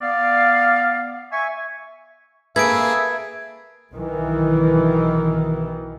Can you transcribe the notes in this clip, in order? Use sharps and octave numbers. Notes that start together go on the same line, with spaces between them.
B3 D5 F5
E5 G#5 C#6
A#3 G#4 A4 B4 E5 G#6 D7
B1 D#3 E3